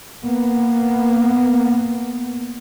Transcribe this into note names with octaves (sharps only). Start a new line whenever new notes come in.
A#3 B3